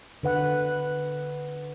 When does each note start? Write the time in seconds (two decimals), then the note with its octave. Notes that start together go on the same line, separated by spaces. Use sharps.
0.23 D3 B4 F#5